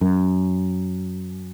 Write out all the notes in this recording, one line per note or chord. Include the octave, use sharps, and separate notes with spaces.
F#2